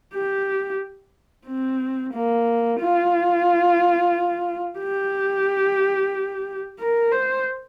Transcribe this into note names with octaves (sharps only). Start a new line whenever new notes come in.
G4
C4
A#3
F4
G4
A#4
C5